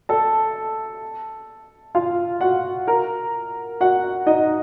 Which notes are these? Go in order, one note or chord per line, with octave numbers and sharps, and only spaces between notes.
A4 A5
F4 F5
F#4 F#5
A#4 A#5
F#4 F#5
D#4 D#5